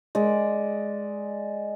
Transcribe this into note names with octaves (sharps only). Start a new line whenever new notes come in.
G#3 D5